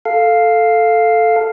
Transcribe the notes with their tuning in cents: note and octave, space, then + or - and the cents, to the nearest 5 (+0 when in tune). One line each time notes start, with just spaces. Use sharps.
A4 +0 F5 +0